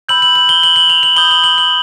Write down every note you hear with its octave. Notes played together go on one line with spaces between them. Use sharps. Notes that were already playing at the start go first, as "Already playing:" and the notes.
B5 E6 G6 F#7
F#7
F#7
G7
F#7
F#7
F7
F#7
B5 D#6 G6 G7
F#7
F#7
F#7